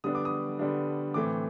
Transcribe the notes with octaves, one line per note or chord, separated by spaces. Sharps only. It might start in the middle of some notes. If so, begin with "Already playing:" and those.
D3 G3 B3 D4 D#6
D6
D#6
D3 G3 B3 D4
A2 E3 A3 C4 D6